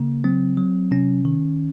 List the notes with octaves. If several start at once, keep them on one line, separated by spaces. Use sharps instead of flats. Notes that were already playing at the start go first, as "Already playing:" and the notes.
Already playing: C#3 A#3
F#3 C4
F#3
C3 C#4
D#3